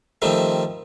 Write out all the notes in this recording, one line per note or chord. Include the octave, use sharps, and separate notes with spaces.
D#3 F3 G3 A3 C4